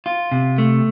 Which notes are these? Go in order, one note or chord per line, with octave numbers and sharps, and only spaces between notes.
F4
C3
A3